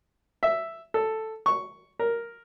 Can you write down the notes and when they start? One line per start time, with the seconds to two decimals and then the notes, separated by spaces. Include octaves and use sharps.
0.43 E5
0.94 A4
1.46 C#6
1.99 A#4